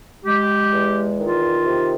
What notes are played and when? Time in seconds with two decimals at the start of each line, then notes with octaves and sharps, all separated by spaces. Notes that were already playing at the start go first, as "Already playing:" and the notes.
0.25 G#3 G4
0.72 E2
1.18 D#3 F4
1.64 C3